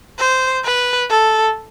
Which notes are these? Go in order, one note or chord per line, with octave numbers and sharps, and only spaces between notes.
C5
B4
A4